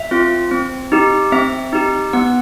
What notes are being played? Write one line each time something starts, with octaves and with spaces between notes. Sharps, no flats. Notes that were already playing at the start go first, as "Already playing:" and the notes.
Already playing: E5
C4 F4
C4
D#4 G4
C4 E5
D#4 G4
B3 F#5